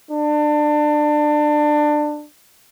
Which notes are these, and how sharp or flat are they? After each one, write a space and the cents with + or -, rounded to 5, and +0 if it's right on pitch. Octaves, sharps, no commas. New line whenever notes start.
D4 +25